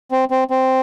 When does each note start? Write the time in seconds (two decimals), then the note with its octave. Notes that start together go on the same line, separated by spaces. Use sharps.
0.11 C4
0.30 C4
0.50 C4